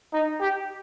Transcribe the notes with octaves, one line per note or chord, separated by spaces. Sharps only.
D#4
G4